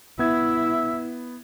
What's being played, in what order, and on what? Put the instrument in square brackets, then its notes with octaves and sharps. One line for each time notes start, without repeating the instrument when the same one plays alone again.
[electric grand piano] B3 G#6 [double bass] E4 [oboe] E5